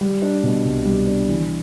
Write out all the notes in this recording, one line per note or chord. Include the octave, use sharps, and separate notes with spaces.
G3
D4
B2
C2
G3
D4
E3